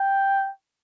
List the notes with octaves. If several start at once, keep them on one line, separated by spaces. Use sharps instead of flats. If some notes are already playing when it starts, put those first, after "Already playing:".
Already playing: G5